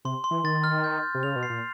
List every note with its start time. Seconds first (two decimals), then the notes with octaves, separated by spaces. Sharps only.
0.05 C3 C6
0.24 C6
0.31 E3
0.44 D#3 A6
0.64 F6
0.84 G6
1.03 G6
1.15 C3
1.23 C#3 F7
1.36 B2
1.43 C7
1.50 A#2